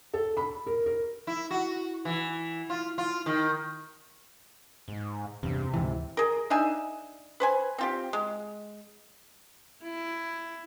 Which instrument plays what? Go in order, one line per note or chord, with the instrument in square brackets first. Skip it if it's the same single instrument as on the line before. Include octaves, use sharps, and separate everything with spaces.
[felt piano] A4
B5
A#4
A#4
[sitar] E4
F#4
E3
F4
F4
D#3
[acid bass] G#2
[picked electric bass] E2 G2 [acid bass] C3
[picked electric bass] D2 G#2 E3
[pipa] G#4 A#4
D4 D#4 E5 G#5
B4 C5 G#5
C4 F4 G4
G#3
[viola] E4